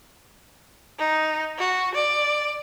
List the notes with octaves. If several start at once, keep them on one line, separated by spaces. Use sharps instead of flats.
D#4
F#4
D5